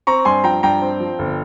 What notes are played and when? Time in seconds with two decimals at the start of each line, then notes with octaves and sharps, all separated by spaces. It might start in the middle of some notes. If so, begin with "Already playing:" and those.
0.07 C4 A#5 C#6
0.25 G2 G#5 C6
0.44 F3 G5 A#5
0.63 G2 G5 A#5
0.82 C4
1.00 F3
1.19 G1